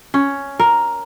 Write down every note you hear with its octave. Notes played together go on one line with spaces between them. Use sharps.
C#4
A#4